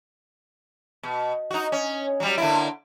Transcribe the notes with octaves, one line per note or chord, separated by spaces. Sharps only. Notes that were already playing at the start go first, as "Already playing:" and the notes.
B2
D#4 F#4
C#4
F#3 G3
D3 A#3 E4